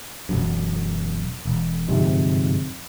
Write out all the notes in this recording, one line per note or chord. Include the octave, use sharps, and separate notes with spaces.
E1 F#2
E1
G1 F2 G#2 C3